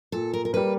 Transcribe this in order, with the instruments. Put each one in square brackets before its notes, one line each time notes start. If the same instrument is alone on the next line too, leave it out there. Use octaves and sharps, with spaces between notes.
[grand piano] A#2 [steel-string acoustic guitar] A4
[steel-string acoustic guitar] A#4
A#4
[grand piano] G3 A#3 [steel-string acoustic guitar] B4